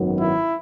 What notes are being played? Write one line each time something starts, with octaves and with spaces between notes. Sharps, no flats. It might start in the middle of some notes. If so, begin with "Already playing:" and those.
Already playing: G#1 F#2 D#3 F#3 B3
E4